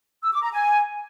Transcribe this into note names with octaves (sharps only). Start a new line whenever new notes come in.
E6
D6
A#5
G#5